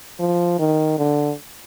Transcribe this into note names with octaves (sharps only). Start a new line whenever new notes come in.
F3
D#3
D3